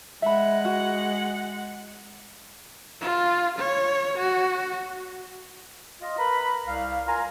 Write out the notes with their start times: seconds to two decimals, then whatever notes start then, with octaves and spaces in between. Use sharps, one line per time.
0.22 G#3 E5 F#5 B5
0.65 F#4
3.01 F4
3.59 C#5
4.19 F#4
6.01 F4 D#5
6.18 A#4 B4 A#5 B5
6.66 C2 F5
7.07 F4 A#4 F5 G#5 A#5